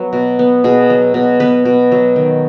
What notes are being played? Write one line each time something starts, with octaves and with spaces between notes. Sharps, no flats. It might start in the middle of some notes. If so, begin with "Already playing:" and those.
Already playing: F#3 B3
B2
B3
B2 G#4
F#3
B2
B3 B4
B2
F#3
D#3